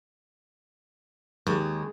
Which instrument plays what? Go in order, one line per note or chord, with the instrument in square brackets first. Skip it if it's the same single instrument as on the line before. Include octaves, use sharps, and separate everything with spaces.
[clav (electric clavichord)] D#2 [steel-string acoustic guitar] G#3